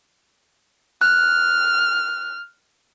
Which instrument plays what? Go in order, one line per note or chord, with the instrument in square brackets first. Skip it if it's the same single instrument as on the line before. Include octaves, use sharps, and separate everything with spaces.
[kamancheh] F6 [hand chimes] F#6